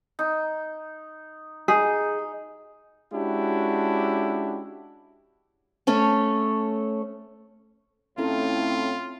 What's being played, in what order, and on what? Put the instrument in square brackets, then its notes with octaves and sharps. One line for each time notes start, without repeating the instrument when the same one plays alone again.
[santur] D#4
[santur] D#4 [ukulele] G#4
[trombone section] G#3 C#4 D4 E4 F#4 G4
[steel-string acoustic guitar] A3 C#4 A4 C#5
[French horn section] A2 [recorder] C4 [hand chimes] C#4 E4 A4 [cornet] F4